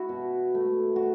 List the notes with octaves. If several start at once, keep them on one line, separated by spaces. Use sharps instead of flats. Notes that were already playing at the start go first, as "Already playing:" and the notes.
Already playing: E4 F#4
B2
A3
F#4